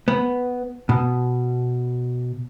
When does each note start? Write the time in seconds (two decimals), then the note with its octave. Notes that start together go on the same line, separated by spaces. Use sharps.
0.08 B3
0.89 B2